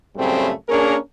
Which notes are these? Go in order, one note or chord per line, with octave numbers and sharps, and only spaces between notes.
F#2 A2 C#3 G3 A3 C4
A#3 C#4 D4 G#4 A#4